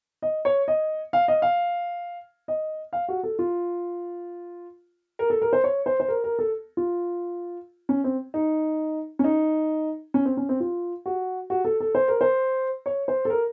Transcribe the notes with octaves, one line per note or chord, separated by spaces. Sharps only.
D#5
C#5
D#5
F5
D#5
F5
D#5
F5
F#4
A4
F4
A#4
A4
A#4
C5
C#5
C5
C5
A#4
A#4
A4
F4
C#4
C4
D#4
C#4
D#4
C#4
C4
C#4
C4
F4
F#4
F#4
A4
A4
C5
A#4
C5
C#5
C5
A4
A#4